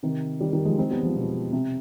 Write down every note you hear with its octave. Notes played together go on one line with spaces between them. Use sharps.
C3 D#3
D#3 G3
D#3 G3
F3 G#3
C4 D#4
G3 B3
F3 G#3
B2
C3